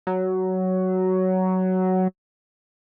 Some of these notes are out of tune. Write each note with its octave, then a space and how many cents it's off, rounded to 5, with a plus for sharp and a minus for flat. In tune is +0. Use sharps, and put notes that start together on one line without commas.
F#3 +10